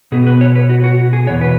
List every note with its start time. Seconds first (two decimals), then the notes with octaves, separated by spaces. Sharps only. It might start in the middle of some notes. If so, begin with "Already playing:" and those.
0.12 B2 B3 G#4
0.27 B4
0.41 C#5
0.55 B4
0.70 F#4
0.84 F#4
1.13 G#4
1.27 E2 B2 B3 C#5
1.41 B4